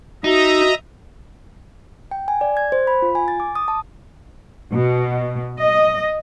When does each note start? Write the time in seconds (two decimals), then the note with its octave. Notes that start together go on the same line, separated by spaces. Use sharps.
0.24 D#4 F#4 D#5 E5 A#5
2.11 G5
2.28 G#5
2.41 D5
2.57 G#6
2.72 C5
2.87 B5
3.02 F4
3.15 G#5
3.28 A6
3.40 D6
3.55 D#6
3.68 A5
4.73 B2
5.59 D#5